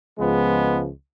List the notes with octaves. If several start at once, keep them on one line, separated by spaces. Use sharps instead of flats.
C#2 C#3 F3 G#3 B3